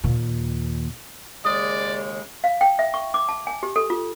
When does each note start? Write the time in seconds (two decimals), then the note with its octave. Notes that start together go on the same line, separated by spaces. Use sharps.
0.04 D#2 A#2
1.45 D#2 C#3 G#3 D5 D#6
2.44 F5
2.61 G5
2.79 E5
2.94 C#6
3.14 D6
3.29 A5
3.47 G#5
3.63 G4
3.76 A4
3.90 F4